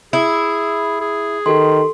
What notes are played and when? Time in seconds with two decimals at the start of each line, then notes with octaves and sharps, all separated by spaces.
0.13 E4 G#4
1.01 G#4
1.46 D#3 G4 A4 C6